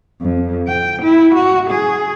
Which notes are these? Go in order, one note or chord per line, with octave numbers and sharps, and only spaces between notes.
F2
G5
E4
F#4
G#4